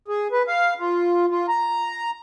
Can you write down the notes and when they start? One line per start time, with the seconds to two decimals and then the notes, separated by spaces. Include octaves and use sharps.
0.08 G#4
0.32 B4
0.48 F5
0.80 F4
1.31 F4
1.48 A#5